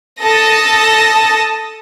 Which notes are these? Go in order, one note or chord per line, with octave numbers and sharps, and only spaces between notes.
A4 A5 D#6 A#6